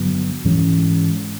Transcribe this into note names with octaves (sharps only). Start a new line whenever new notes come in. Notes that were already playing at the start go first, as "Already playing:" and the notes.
Already playing: G2 D3 F#3 B3
G#2 E3 G#3 C#4